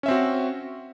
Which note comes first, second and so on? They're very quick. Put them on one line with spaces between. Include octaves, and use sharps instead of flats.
C#4 E5 C4 F#4